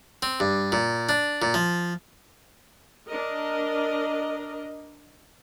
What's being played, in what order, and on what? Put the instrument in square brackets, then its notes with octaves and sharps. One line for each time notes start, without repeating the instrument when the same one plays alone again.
[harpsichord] C4
G2
A#2
D4
A#2
F3
[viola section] D4 A#4 D#5